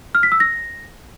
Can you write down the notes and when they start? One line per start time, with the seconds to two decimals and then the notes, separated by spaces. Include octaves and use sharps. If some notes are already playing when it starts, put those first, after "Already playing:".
0.15 F6
0.23 B6
0.32 E6
0.40 A#6